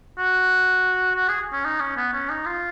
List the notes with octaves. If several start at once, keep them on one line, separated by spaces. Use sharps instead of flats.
F#4
F#4
G#4
C#4
D#4
C#4
B3
C#4
D#4
F4